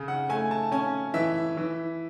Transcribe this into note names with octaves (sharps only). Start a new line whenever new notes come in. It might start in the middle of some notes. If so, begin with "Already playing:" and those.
Already playing: C#3
F#5
A3 G#5
A5
C#4 G#5
E3 E5
E3